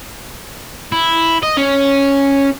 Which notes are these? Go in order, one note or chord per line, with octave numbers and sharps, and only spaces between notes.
E4
D#5
C#4